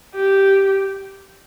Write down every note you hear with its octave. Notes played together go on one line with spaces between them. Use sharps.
G4